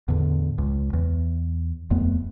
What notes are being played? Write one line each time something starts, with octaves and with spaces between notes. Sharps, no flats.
E2 A2 D3
C#2
E2
D#1 F2 A3 B3